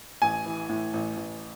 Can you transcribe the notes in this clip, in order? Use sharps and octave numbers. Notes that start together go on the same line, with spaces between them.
A1 G#5
E3
A2
A1
A1